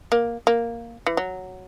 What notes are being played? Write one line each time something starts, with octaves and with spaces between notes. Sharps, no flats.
A#3
A#3
E3
F#3